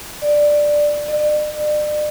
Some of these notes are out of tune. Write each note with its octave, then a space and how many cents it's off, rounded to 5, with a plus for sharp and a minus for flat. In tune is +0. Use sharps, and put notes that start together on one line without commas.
D5 +5
D5 +40